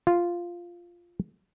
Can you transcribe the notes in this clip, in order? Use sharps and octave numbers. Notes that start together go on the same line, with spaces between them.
F4